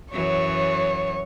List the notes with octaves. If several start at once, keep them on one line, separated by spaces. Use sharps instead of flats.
F#2 E3 F#3 C#5